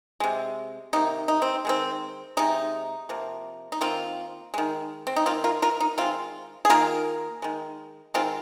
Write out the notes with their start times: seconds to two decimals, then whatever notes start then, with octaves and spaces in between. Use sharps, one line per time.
0.20 C3 G#3
0.93 C3 D#3 A#3 D#4
1.28 D#4
1.42 C4
1.65 D#3 G#3 C4
2.37 C3 G#3 D#4
3.09 C3 F3 A#3
3.72 D#4
3.81 D#3 A#3 C4 F4
4.54 D#3 G#3
5.07 C4
5.16 D#4
5.26 D#3 A#3 C4 F4
5.44 F4 A#4
5.62 F4 A#4
5.80 D#4
5.97 D#3 G#3 C4 F4
6.65 G#4
6.70 D#3 A#3 F4 A#4
7.42 D#3 G#3
8.14 D#3 G#3 C4 F4